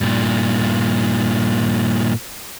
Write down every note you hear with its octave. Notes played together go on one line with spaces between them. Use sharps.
G2 A#2